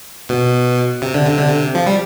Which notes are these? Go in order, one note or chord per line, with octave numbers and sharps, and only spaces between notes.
B2
C3
D3
C3
D3
C3
F3
G3